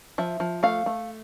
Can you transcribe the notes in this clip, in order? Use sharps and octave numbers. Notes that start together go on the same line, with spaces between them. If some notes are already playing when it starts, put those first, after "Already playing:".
F3 E5
F3
A3 F5
A3